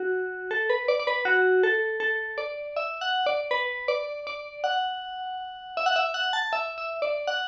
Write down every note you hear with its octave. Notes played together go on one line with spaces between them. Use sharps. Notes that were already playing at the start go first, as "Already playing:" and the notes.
Already playing: F#4
A4
B4
D5
D5
B4
F#4
A4
A4
D5
E5
F#5
D5
B4
D5
D5
F#5
E5
F#5
E5
F#5
A5
E5
E5
D5
F#5